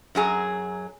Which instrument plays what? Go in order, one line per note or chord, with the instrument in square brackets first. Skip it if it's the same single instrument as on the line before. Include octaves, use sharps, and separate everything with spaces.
[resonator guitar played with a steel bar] F#2 F#3 G#4 A#5